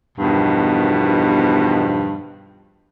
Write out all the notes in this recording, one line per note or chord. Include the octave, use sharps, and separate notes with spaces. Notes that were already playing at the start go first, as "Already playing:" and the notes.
E2 G2 B2 D#3 F3